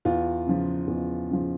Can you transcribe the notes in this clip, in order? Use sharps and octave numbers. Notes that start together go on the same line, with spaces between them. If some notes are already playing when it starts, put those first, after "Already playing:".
E2 F4
C#3 F3
E2
C#3 F3